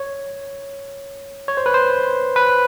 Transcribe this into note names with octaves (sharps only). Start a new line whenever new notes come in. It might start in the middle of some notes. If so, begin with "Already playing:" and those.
Already playing: C#5
C#5
C5
B4
C5
B4